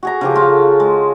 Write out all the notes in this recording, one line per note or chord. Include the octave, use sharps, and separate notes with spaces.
F#4 G#4 A#5
C#3 F3 G4
F4 F#4 A4
G#3